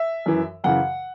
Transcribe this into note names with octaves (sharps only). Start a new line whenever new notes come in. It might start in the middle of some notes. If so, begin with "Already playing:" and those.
Already playing: E5
F#2 E3
F#2 C#3 E3 F#5